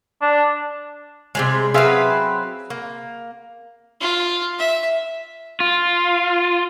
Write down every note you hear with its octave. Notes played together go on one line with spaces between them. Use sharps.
D4
C3 G3 G#3
F#3 C4 G#4 B4 E5 F5
A#3
F4
E5
F4